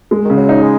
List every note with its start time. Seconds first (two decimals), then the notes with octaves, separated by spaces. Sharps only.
0.11 G#3
0.25 D#3
0.30 C#3
0.37 F#3
0.49 D#4
0.62 G#3